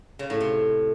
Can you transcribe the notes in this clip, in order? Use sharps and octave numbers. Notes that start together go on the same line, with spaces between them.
C#3
A2
C3